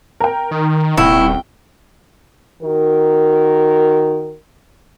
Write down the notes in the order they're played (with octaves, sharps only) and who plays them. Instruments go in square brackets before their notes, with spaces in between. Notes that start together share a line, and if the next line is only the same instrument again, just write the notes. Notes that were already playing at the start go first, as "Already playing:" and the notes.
[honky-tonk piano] A#4 G5
[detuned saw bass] D#3
[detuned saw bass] D#1 [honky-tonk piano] C2 C#6 [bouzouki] E4 [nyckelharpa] G5
[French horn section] D#3 F#4 A#4